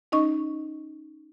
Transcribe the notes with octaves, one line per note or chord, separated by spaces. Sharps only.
C#4 D#4 D#5 C#6